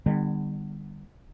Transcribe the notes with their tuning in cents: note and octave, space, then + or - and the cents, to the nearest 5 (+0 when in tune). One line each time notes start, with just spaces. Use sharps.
D3 +40 G3 +15 B3 +0